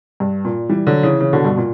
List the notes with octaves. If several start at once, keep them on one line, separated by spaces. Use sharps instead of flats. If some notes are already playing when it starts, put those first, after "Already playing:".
G2
A#2
E3 G3
D3 F#3
C#3 E3
C#3 E3
B2 D3
G2 B2
A#2